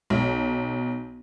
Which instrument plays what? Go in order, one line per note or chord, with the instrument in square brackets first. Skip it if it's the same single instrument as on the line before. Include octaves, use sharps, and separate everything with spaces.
[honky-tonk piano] B1